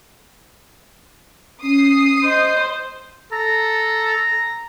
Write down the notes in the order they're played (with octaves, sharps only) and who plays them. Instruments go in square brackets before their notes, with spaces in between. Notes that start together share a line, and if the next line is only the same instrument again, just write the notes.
[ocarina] C#4 [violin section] D#6 C7
[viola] C5 [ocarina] D#5
[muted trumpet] A4 [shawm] A#5